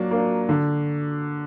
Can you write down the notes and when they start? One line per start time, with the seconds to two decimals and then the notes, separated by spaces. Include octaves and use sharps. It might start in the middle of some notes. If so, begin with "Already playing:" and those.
Already playing: F#3 A#3 D4
0.11 A#3 D4
0.49 D3